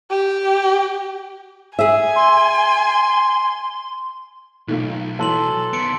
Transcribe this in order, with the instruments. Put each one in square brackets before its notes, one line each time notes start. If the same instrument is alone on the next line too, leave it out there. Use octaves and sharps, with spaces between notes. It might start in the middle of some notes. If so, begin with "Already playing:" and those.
[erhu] G4
[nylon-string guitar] G#4 E5 [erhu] G#5
[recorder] C6
[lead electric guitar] B1 [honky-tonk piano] D#3 A3 F4
[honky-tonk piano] E3 F#3 [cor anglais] A4 [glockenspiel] A5 C6 F#7
[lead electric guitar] D#3 B3 [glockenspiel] C6 C#7 D7